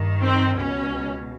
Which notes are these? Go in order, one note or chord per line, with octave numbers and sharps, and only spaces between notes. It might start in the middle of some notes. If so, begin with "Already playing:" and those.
Already playing: G2 D#3
C4
C#2 B2 C#4